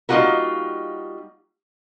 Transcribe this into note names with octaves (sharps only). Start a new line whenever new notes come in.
G3 A#3 D#4 F4 F#4 A#4